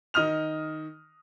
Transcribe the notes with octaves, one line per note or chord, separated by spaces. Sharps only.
D#3 D#5 D#6 F6 F7